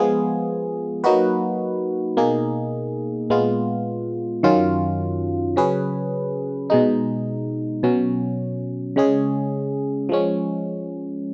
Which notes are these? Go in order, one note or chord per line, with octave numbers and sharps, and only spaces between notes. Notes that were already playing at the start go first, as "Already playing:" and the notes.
Already playing: F3 G#3 B3 F4 G#4
F#3 A#3 D#4 F#4 B4
B2 A#3 D#4 G#4
A#2 G#3 B3 F4
F#2 D#3 F#3 C#4 F4
C#3 F#3 C#4 G#4 B4
B2 G#3 D#4
B2 F#3 C#4
C#3 G#3 C#4 G#4
F3 G#3 C#4